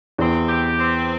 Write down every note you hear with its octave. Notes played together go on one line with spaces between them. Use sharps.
E2 C4
G4
C4